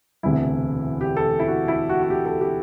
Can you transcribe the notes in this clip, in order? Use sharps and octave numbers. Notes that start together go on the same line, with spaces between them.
E1 D2 C3 E3 E4
G4
A4
E4
F#4
E4
F#4
F#4
G4
A4
G4